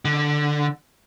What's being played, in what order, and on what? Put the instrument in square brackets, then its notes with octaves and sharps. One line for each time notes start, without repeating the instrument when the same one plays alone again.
[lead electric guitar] D3